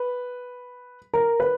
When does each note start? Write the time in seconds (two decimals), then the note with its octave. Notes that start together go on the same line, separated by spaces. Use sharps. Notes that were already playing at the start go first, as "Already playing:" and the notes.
Already playing: B4
1.14 A#4
1.40 B4